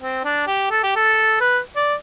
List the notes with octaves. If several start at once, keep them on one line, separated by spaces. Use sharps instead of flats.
C4
D4
G4
A4
G4
A4
B4
D5